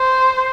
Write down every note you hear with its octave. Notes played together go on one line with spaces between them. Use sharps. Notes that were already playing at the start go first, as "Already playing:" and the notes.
Already playing: C5